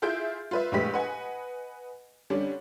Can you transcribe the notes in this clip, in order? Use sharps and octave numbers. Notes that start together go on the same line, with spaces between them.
E4 F4 G#4 E5 G6 D7
F4 B4 E5
A#1 A2 G#3 G4 B4 B6
B4 D#5 F#5 G#5
D3 G3 C#4 D4